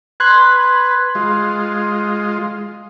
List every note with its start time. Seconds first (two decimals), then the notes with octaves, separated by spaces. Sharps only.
0.20 B4 C6 F#6 G#6
1.15 G#3 F4